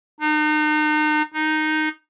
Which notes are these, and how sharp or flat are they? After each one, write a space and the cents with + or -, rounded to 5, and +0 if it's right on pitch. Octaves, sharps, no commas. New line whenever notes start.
D#4 -35
D#4 -5